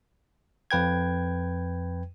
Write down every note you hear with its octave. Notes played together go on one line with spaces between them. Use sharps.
F2 B4 G5 G#6